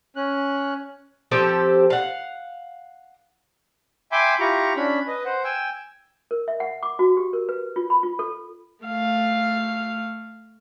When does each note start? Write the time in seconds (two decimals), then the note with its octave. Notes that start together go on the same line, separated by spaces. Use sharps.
0.16 C#4 F#6
1.31 F3 C4 G4 A4
1.90 F5 F#5
4.12 E5 G5 G#5 B5 C6 D6
4.40 E4 F4 G4 A#5 C#6
4.76 C#4 D4 B5
5.07 B4 D#5
5.25 C5 F#5
5.44 G5 G#5 E6
6.31 A#4
6.48 E5
6.60 F#5
6.83 D6
6.99 F#4
7.17 G4
7.33 A#4
7.49 B4
7.76 F4
7.90 B5
8.03 F4
8.19 A4
8.85 A3 F5